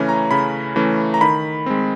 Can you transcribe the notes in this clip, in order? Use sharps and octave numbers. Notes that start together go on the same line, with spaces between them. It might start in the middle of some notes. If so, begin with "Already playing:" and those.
Already playing: C#3 E3 A3 C#4 G#5
A#5
C#3 B5
E3 A3 C#4
A#5
D#3 B5
G#3 C4